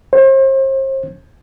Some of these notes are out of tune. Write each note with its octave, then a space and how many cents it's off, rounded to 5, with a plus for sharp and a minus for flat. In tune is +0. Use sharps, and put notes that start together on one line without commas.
C5 +40